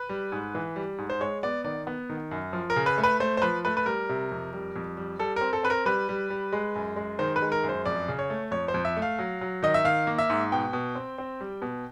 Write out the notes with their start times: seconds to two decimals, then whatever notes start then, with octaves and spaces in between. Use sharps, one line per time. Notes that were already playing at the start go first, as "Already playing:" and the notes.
Already playing: B4
0.09 G3
0.32 G#2
0.55 E3
0.76 G3
0.98 G#2
1.10 C5
1.20 G#3 C#5
1.43 B3 D5
1.64 D#3 D5
1.87 B3
2.09 D#3
2.31 F#2
2.53 F3
2.70 A#4
2.76 C#3
2.86 B4
2.98 A3
3.03 B4
3.20 A3 C5
3.37 C5
3.42 F3 B4
3.65 A3 B4
3.77 B4
3.86 G3 A#4
4.09 C3
4.32 F2
4.53 G3
4.76 F2
4.97 G3
5.19 G3 A4
5.36 C4 A#4
5.53 A4
5.63 C4 B4
5.70 A#4
5.85 G3 B4
6.09 G3
6.30 G3
6.53 G#3
6.75 F#2
6.96 G#3
7.19 D#3 C5
7.36 B4
7.42 G#3
7.52 A#4
7.63 F#2
7.69 C5
7.86 F2 D5
8.08 C#3
8.19 C#5
8.30 A3
8.51 F2 C#5
8.68 C5
8.74 F2
8.85 E5
8.97 A3
9.02 F5
9.19 F#3
9.41 F#3
9.63 D#3 D#5
9.74 E5
9.84 D#3 F5
10.07 A#3
10.18 E5
10.30 G#2
10.52 B2 G5
10.73 B2
10.95 C4
11.18 C4
11.41 G3
11.62 B2